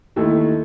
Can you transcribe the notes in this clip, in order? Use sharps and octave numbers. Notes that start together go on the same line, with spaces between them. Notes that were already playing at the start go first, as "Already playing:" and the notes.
D#2 D#3 A3 E4